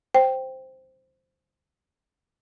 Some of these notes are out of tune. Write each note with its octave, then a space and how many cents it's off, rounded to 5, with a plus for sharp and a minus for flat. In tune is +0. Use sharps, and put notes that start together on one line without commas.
C5 +0 G5 +0